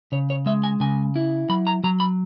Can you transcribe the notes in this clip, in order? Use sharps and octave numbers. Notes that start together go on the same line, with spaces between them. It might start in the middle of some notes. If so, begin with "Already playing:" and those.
C#3 C#5
C#5
G#3 E5
G#5
C#3 G#5
E4
F#3 B5
A#5
F#3 A#5
B5